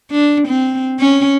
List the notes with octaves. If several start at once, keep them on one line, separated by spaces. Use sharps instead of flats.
D4
C4
C#4